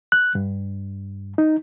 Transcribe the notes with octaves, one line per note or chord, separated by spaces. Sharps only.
F#6
G2
D#4